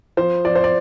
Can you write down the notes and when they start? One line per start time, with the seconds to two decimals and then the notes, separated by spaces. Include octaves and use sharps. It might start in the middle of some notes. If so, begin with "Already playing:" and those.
0.17 F3 C5
0.45 F3 D5
0.55 C5
0.64 D5